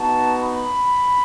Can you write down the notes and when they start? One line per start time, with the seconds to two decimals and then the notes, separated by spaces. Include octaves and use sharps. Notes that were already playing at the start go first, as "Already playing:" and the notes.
Already playing: B3 D#4 F#4 A5
0.38 B5